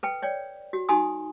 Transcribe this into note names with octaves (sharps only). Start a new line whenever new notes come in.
A4 B4 G5
C#5 D5 G5
F#4
D#4 F#4 A4 G#5 C6 D#6